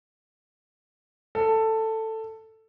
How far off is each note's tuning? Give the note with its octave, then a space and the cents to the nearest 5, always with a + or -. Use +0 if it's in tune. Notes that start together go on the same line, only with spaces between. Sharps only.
A4 +10